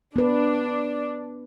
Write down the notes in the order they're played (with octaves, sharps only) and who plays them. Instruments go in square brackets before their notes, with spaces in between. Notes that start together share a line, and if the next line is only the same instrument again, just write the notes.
[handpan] B3 B4 [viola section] D4